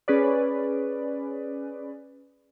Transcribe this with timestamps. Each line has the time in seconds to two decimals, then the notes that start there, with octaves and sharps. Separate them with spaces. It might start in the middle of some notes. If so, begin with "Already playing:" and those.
0.08 C#4 G#4 B4 D5